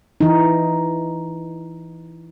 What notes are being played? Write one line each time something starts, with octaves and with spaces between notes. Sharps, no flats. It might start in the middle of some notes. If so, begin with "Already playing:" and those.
E3 D#4